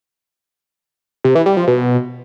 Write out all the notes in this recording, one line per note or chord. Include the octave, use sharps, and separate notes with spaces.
C3
E3
G3
F3
B2